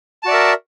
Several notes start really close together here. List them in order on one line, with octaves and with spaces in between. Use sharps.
A5 F#4 D5 E5 A#4